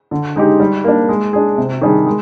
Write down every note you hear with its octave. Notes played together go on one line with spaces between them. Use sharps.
D3
G#3 D#4 G4
G3
A#3 D4
G#3
D4 G#4
C3
D#3 G3 D4 G#4
G#3